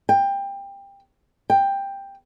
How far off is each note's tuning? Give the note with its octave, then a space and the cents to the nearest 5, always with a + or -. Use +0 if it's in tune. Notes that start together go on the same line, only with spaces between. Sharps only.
G5 +20
G5 +10